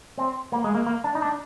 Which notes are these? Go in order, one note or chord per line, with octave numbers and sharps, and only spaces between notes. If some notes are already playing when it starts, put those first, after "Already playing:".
C4
A#3
G#3
A#3
A#3
D4
D#4
D4